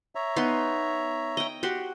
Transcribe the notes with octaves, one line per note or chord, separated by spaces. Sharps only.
C#5 E5 A#5
B3 D#4 C6
D#5 G5
F#4 G4 C6